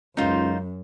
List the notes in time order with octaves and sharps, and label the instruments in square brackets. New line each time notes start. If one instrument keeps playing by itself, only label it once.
[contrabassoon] C#2 [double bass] F#2 [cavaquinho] D#4 F4 C5